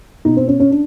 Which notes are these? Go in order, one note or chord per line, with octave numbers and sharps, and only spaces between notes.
B2 D#4
C4
C#4
C#4
D4